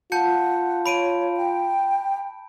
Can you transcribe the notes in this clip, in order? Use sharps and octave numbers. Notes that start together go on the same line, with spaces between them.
F4 F#5 A5 G6 C#7
C#5 B5 D7 D#7
G5